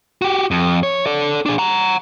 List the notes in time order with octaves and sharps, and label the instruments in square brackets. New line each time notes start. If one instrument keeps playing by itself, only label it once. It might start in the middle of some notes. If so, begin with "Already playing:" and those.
[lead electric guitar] F#4 G4
F2
C#5
A4 D5
D4 G#4
F#5 A#5